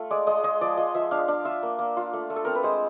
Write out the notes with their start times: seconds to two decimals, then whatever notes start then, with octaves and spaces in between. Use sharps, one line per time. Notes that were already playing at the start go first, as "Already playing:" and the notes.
Already playing: A3 F4
0.10 G#3 D5
0.27 G#3 D#5
0.43 G#3 D#5
0.61 F3 D5
0.77 F3 D#5
0.94 F3 E5
1.11 D4 F5
1.28 D4 F5
1.45 F4 E5
1.63 A#3
1.79 A#3
1.97 F4
2.13 A3
2.30 A3
2.36 A4
2.45 C4 A#4
2.55 B4
2.64 G#3 C5